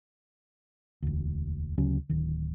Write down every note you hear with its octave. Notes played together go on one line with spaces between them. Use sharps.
E1 D2
D2 C#3 F#3 C#4
D1 D#3